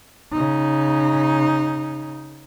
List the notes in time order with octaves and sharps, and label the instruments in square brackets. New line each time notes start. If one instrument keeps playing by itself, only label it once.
[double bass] C#3 D#4